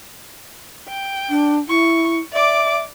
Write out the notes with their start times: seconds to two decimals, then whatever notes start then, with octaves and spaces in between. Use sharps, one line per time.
0.88 G5
1.30 D4
1.68 E4 C#6
2.33 D5 E5 D6